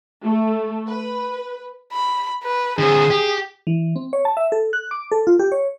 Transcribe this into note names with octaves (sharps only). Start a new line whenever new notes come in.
A3
B4
B5
B4
D3 C4 G#4
G4
E3
C4
C#5
A5
E5
A4
F#6
D6
A4
F4
G4
C#5